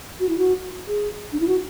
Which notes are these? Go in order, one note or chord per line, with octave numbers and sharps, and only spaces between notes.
F#4
E4
F#4
G#4
D4
E4
F#4